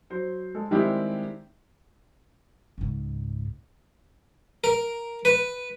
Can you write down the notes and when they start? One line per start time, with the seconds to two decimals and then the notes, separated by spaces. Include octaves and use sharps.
0.10 F#3 C5
0.55 G#3 A4
0.71 D#3 G3 G#3 C4 E4 G4
2.78 C#2 G#2
4.64 A#4
5.25 B4